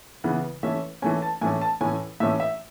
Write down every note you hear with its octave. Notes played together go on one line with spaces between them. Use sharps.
C#3 E3 B3
E3 A3 C#4 E5
E3 A3 C#4 G#5
A5
A2 E3 A3 C#4 G#5
A5
A2 E3 A3 C#4 G#5
A2 E3 A3 C#4 E5
E5